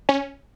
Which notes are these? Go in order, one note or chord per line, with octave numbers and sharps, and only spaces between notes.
C#4